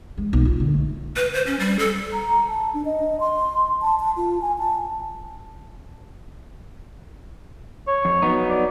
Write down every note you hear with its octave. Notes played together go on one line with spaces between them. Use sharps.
G#3
B1
F4
D3
A3
B4
C5
C#4
G3
A4
A#5
A5
D4
D#5
C6
A5
A5
F4
G#5
A5
C#5
F2
F#3 B3 D#4
D5